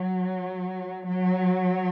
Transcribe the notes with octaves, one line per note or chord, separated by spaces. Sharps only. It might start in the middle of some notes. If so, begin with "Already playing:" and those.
Already playing: F#3
F#3